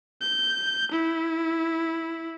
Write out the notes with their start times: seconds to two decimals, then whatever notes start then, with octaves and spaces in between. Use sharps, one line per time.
0.21 G6
0.92 E4